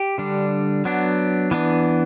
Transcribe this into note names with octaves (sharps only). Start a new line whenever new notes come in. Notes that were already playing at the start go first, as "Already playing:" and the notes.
Already playing: G4
D3 G3 D4
F#3 B3 D4
E3 B3 D4